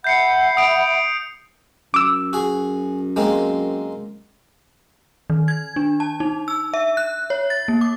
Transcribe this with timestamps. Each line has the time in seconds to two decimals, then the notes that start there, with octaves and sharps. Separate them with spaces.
0.04 E5 F#5 B5 G6 C7 C#7
0.57 D#6 D7 F7
1.94 F#2 D6 E6
2.33 F#4 G#4
3.16 G#3 A#3 C4
5.30 D#3
5.48 G#6
5.76 D4
6.00 A5
6.20 D#4
6.48 E6
6.74 E5
6.97 F#6
7.30 C#5
7.50 A6
7.68 A#3
7.81 D6